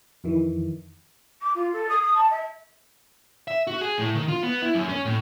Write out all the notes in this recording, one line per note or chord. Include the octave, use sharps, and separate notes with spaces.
F2 D#3 E3
D6
F4
A4
D#6
D#6
A5
E5
E5
F#4
G#4
A2
D#3
F4
B3
E4
F#2
C#4
A2